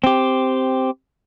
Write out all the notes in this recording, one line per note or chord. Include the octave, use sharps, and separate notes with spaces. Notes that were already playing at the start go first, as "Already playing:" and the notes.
C4 G4